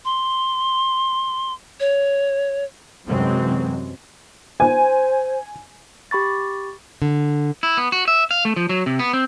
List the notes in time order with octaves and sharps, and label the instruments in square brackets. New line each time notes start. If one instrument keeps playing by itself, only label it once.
[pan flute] C6
C#5
[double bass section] F#2 C3 E3 F#3 G#3 C4
[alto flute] C5 [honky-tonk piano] G#5
[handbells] G4 B5 C#6 A6
[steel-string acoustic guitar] D3
[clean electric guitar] E4
B3
F#4
E5
F5
A3
F3
F#3
C3
B3
C4